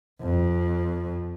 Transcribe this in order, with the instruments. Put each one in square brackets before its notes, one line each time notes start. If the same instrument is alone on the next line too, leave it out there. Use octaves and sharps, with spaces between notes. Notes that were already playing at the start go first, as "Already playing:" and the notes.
[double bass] F2